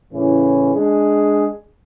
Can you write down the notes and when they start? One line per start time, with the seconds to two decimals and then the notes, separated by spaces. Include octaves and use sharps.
0.13 A2 C#3 E3 C#4
0.74 G#3 D4 G#4